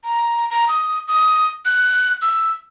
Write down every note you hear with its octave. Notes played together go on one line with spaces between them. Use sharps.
A#5
A#5
D#6
D#6
F#6
E6